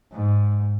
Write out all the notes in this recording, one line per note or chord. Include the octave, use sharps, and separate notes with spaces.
G#2